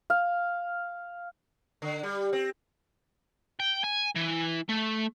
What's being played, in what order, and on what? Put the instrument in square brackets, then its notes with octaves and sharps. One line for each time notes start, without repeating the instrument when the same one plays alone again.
[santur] F5
[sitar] D3
G3
C4
[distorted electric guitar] G5
G#5
E3
A3